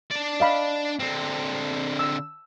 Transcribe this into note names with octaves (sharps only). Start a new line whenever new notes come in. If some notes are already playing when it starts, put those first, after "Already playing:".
D4 D5
D#5 F5 B5
D3 C4
E6